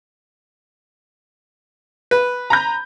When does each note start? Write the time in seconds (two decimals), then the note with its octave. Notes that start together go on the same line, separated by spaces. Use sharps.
2.11 B4
2.50 A#5 B5 G6